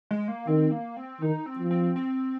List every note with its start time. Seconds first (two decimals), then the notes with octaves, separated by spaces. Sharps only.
0.11 G#3
0.28 A#3
0.47 D#3 C4
0.71 A#3
0.97 C4
1.21 D#3 D#4
1.46 C4
1.59 F3
1.71 C4
1.96 C4